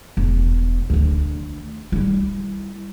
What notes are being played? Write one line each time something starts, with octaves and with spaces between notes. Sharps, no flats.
E1
D2 D3
G3 E4